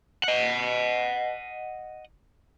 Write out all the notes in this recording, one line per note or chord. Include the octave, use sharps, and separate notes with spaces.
D#5 F#5